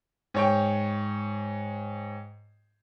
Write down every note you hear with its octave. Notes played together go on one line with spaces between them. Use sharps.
G#2 C#5 G5